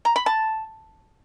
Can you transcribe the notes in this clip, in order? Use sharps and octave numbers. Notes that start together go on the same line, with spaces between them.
A#5
B5
A5